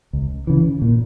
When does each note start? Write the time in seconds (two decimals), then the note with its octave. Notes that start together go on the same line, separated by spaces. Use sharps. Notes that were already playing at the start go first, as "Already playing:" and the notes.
0.13 C#2
0.47 C#3 E3
0.82 A#2